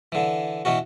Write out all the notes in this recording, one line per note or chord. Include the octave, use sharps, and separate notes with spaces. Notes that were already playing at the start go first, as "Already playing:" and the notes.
D3 E3
B2 E3 C#4 F#4